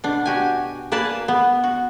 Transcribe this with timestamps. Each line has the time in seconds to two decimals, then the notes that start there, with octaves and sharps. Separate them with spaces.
0.04 B2 D4
0.26 F#4 G4 G#5
0.92 A#3 B4 D5 G#5 A5
1.28 B3
1.64 F#4